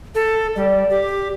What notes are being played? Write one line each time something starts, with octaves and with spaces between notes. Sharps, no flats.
A4
G3 D5
G4